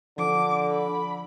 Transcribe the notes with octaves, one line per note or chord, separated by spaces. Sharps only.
D3 F3 D4 D6
B5